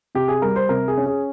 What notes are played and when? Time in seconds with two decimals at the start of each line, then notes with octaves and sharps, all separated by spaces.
0.15 C3 G4
0.28 G#4
0.42 G3 A#4
0.56 C5
0.69 C3 A#4
0.88 G#4
0.97 C#4
1.06 G#4